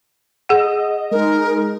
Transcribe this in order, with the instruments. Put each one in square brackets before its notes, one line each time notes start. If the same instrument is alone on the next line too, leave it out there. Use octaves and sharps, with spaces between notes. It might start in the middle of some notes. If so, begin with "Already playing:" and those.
[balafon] G#4 F#5 [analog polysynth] D#5
[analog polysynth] G#3 D#4 [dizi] A#4